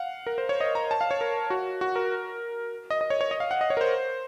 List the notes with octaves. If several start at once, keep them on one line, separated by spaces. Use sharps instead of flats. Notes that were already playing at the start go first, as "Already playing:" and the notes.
Already playing: F5 F#5
A#4
C5
C#5
D#5
A#5
A5
F5
C#5
A#4
F#4
F#4
A#4
D#5
D#5
C#5
C#5
D#5
F5
F#5
D#5
C#5
A#4
C5